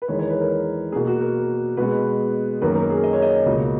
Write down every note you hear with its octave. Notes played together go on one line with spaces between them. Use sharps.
B4
E2 D#3 G#3 C#5
C#5
B4
A#4
B2 A#3 G#4
F#4
A#4
B2 G#3 B3 B4
F#2 D#3 A#3 B4
A#4
G#4
D#5
C#5
D#5
C#2 B2 A#3